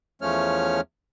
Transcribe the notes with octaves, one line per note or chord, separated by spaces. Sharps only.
E2 F3 A3 C#4 C#5 F6